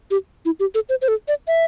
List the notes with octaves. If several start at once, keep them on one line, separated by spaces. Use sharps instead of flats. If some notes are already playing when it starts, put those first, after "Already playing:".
G4
E4
G4
A4
C5
C5
A4
D5
E5